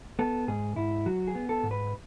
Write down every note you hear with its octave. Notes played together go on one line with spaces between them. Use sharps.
B3 A4
G#2 G#4
G#2 E4
F#3 F#4
G#4
B3
A4
G#2
B4